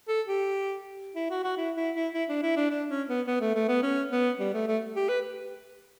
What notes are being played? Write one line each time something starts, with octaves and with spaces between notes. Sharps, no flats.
A4
G4
E4
F#4
F#4
E4
E4
E4
E4
D4
E4
D4
D4
C#4
B3
B3
A3
A3
B3
C#4
B3
G3
A3
A3
G4
B4